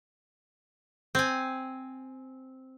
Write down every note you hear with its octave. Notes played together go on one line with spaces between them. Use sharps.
C4 G#5